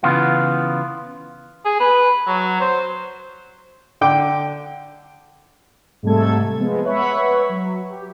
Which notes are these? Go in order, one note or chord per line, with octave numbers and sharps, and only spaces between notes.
C#3 E3 B3 F4 F#5
G#4
B4
F#3
C5
D3 G5 D6
G#2 C3 G3 A3 A4 G#6
F3 G#3 B3
B4 C#5 E5 F#5 B5 C#6
F#3
G4